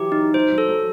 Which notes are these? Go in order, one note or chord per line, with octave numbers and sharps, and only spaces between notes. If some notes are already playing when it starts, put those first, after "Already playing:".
Already playing: E3 F#3 G4
D#4
F#3 C5
F#3
A4
F#3